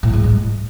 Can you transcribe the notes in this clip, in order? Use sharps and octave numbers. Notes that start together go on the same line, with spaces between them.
A2
G#2
G#3